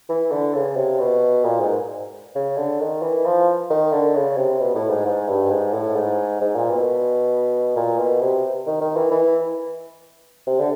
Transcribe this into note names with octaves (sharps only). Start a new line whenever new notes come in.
E3
D3
C#3
C3
B2
A#2
G#2
C#3
D3
D#3
E3
F3
D#3
D3
C#3
C3
B2
A2
G#2
G#2
G2
G#2
A2
G#2
G#2
A#2
B2
A#2
B2
C3
D#3
D#3
E3
E3
C3
D3